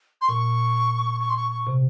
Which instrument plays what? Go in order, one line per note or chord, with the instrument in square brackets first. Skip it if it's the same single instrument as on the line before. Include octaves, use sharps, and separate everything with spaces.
[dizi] C6
[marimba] A#2 [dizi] C#6
[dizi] C#6
C6
C#6
C#6
[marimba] C3